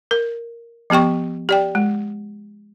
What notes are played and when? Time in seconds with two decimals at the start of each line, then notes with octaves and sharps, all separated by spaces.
0.11 A#4
0.90 F3 B3 G4 G5 C#6
1.49 G4 D5 G5
1.75 G#3